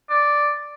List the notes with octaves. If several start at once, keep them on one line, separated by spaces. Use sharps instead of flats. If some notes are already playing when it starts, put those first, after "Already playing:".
D5